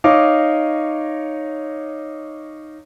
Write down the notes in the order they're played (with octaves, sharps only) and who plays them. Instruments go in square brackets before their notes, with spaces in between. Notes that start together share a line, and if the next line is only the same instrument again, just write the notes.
[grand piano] D#4 C#5 D#5 F5 D6